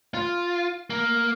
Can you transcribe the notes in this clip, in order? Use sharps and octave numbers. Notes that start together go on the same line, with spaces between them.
F4
A#3